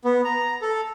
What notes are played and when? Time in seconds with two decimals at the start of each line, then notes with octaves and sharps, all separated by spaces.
0.05 B3
0.24 A#5
0.62 A4